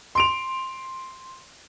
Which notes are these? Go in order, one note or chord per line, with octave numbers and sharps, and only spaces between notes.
C6 D7 F7